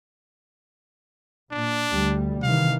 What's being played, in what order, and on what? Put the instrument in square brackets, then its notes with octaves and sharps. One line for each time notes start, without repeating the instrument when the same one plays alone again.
[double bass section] A#2 [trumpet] D4
[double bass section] D2 G3
[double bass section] C3 D#3 E3 [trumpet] F5